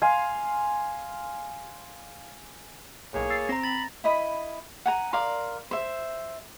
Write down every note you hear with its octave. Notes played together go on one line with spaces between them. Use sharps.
F5 G#5 C6
B1 A2 A#3 G#4 C#5
E6 A6 C7
C4 A#5 A#6
B5 A6
E4 D#5 B5
F#5 G#5 A#5
A#4 D5 F5 C6
C5 E5